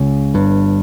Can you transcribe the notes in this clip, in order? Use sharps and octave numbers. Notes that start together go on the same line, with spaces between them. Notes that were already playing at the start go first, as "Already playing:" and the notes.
Already playing: C#2 C#3
G1 G2